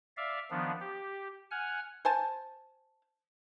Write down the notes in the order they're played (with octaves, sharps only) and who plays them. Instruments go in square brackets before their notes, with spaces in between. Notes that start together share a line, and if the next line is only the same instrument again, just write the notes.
[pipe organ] D5 E5 F5
D#3 F3 B3 D4
G4
F#5 G#5 F6
[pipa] C5 G#5 A5